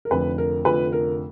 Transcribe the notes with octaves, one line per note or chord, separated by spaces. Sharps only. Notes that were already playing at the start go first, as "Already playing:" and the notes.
A#4
F1 F2 D3 F3 B4
A#4
F1 F2 D3 F3 B4
A#4